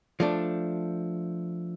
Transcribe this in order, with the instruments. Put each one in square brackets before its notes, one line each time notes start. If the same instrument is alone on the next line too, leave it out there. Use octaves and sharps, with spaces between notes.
[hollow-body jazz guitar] F3 A3 D4